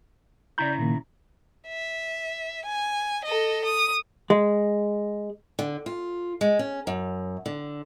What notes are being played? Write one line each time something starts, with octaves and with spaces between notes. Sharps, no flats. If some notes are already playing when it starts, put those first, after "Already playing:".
C#3 E4 D5 A#5 G6
A#2 D#3 A#3
E5
G#5
A4 D#5
D#6
G#3
D3
F4
G#3
C#4
F#2
D3